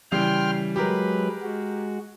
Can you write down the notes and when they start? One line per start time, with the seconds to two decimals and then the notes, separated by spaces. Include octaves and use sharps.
0.12 C#3 E3 G3 G5 C6 F6
0.76 F#3 G#3 G4 G#4 A#4 B4
1.43 G#3 F#4